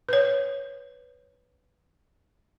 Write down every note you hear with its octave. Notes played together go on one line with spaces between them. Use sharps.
B4 C#5